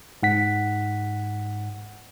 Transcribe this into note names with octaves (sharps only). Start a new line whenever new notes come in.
G#2 F#5 B6